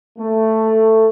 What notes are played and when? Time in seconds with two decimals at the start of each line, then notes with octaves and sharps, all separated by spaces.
0.19 A3